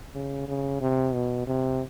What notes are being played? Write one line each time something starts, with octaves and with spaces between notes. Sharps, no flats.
C#3
C#3
C3
B2
C3